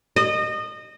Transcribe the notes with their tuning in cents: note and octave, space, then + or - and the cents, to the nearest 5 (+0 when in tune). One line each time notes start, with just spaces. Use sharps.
D#5 -25